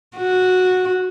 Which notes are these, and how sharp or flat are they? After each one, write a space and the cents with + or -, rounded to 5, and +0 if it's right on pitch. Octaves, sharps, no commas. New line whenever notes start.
F#4 -10